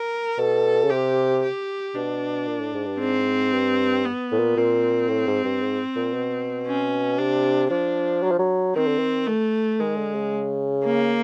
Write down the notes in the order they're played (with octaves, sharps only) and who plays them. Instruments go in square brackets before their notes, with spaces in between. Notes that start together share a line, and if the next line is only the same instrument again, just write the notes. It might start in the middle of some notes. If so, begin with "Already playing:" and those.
Already playing: [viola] A#4
[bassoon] B2 [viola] A4
[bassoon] C#3
[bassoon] C3 [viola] G4
[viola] G4
[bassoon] B2 [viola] D4
[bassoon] A#2
A2
G#2
G2
[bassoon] G#2 [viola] C4
[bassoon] G2
[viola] B3
[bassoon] A2
A#2
[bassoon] A#2 [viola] C4
[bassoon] A2
G#2
G2
G#2
A#2
B2
[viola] C#4
[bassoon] C3 [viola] D4
[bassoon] F3 [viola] D4
[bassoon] F#3
F3
F#3
[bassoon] D#3 [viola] C4
[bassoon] D3
D#3
[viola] A3
[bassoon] D#3 [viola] G#3
[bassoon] D3
C#3
[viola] A#3